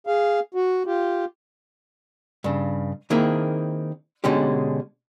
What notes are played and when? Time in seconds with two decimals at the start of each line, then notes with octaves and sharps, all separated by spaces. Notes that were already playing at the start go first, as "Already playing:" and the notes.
0.07 G#4 F5
0.54 F#4
0.86 F4 G4
2.44 G2 C#3
3.10 D#3 A#3 C4 E4 G#4
4.24 B2 D3 G#3 C#4 G4